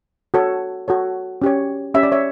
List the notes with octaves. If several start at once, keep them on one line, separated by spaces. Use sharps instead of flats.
F#4 A4 C#5
F#4 A4 C#5
C#4 G4 C#5
C#4 G4 C#5 E5
D5
C#5 E5